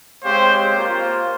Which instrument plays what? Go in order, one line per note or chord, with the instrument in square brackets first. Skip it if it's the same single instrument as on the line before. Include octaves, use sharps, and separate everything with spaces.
[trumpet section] G#3 C4 G4 C#5 F5 [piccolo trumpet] C5
[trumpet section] A#3 F4 C5